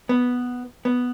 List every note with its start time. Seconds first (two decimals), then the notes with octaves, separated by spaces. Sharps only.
0.09 B3
0.85 B3